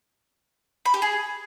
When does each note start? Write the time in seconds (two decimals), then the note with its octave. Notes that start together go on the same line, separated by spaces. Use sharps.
0.85 B5
0.94 G4
1.02 G#4